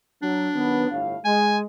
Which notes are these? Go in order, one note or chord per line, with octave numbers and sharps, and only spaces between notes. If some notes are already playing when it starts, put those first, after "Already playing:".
F#3 D4
D#3 F#3 B3
G1 A2 F5
G#3 G#5